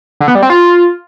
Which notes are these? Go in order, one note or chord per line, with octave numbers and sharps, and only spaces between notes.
D3
B3
G3
C4
F4